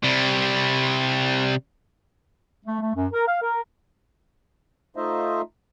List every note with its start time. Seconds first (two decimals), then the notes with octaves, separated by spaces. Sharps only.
0.03 C3 G3
2.66 A3
2.81 A3
2.95 F#2
3.12 A#4
3.27 F5
3.42 A#4
4.96 A3 D#4 F4 C5 D#5 E5